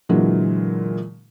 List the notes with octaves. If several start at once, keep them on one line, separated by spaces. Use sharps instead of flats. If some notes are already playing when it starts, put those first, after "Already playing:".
A#2 D3 E3 F#3 G#3